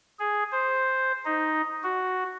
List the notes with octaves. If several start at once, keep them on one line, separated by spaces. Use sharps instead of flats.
G#4
C5
D#4
F#4